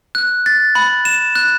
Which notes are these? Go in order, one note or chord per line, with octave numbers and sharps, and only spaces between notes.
F#6
A6
B5
E7
F#6